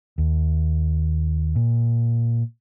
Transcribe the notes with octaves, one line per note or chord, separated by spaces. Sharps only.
D#2
A#2